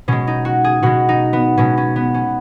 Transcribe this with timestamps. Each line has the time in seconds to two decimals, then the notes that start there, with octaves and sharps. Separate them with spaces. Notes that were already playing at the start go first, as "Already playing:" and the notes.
0.08 B2 G#3 C#4
0.27 D#4
0.45 F#4
0.64 G#4
0.82 B2 G#3 F#4
1.09 D#4
1.33 B3
1.57 B2 G#3 C#4
1.77 C#4
1.96 B3
2.14 C#4